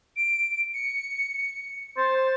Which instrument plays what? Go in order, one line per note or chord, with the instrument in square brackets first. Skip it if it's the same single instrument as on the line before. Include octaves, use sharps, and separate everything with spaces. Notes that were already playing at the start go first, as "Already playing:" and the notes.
[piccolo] D7
C#7
[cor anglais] C5 [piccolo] A6